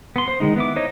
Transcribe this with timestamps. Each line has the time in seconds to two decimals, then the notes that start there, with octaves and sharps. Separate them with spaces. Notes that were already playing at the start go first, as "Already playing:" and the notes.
0.16 B3 C6
0.28 C5
0.40 D#3 G3 G#3 D#4
0.56 B3 E4 D6
0.76 D#4 C5 C#5 D#5